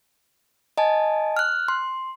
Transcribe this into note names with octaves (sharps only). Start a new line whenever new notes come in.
D#5 G#5 A5
F6 F#6
C6